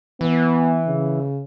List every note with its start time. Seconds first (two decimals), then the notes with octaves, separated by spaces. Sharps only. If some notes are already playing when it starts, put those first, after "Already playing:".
0.21 E3 B3
0.87 C#3